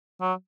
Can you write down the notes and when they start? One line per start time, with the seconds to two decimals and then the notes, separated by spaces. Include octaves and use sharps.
0.21 F#3